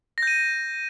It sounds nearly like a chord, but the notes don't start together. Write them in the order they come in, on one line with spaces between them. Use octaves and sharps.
A#6 G6 D#7